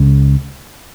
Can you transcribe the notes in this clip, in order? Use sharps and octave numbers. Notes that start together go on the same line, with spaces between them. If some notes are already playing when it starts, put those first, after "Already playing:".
Already playing: C#2 C#3 G#3